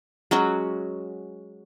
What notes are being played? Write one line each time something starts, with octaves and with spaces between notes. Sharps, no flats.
F#3 G#3 C#4 F#4